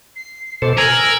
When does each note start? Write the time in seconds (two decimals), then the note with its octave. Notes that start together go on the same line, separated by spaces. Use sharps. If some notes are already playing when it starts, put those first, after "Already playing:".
0.16 C7
0.62 B2 A4 C5 D6
0.78 A#4 G#5 E6 F#7